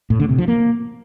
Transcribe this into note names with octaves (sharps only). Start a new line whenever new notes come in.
A2
D3
C3
F3
A#3